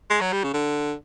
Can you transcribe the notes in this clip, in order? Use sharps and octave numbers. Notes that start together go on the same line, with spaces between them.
G#3
F#3
G3
C#3
D3